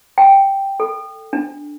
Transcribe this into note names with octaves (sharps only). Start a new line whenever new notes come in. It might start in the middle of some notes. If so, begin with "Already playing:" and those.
G5
A4
D4